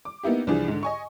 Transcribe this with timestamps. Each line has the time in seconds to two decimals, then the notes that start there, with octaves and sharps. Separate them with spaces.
0.05 D6
0.23 A#3 B3 D#4 E4 G4
0.47 C2 E3 F3 D4 G#4
0.68 G#2 D3
0.83 D#5 G#5 C#6